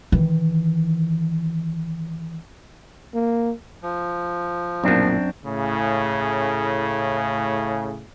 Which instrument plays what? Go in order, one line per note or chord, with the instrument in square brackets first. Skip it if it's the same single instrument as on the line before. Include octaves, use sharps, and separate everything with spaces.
[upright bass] D#3 E3
[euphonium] A#3
[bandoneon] F3
[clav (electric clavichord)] B1 A#2 [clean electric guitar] F#2 C4 D4
[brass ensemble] A2 C#3